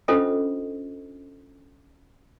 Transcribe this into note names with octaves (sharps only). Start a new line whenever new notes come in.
C#4 D4 F4 A4 C5 D#5